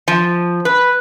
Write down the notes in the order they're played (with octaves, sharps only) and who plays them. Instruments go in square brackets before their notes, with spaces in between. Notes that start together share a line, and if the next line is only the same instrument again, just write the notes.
[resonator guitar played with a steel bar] F3
B4